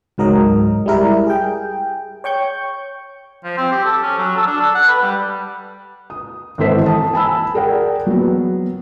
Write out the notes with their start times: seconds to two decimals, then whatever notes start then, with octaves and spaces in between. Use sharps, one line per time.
0.18 C#2 G#2 F#3 A#4 D#5
0.86 G3 G#3 E4 A#4
1.27 G#4 G5
2.24 C#5 G5 C#6 G6
3.44 F3
3.58 C4
3.72 G4
3.85 A4
4.02 C#4
4.18 F#3
4.36 A4
4.47 D4
4.60 A4
4.75 F#5
4.88 B4
5.02 G3
6.10 D#6
6.58 G#1 E3 A4 C5 B6
6.86 A5 D#6
7.13 G#5 A5 B5 E6
7.55 G#4 A#4 D5 F#5 G5
8.07 F#3 B3